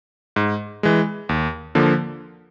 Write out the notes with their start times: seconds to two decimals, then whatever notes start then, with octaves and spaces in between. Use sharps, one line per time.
0.36 G#2
0.83 E3 G#3
1.29 D#2
1.75 D3 F3 A#3